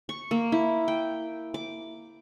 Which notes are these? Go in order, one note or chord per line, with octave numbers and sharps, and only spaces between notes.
C#6
A#3
E4
G5
D6